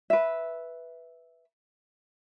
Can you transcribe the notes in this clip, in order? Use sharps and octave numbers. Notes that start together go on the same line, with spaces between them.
B4 E5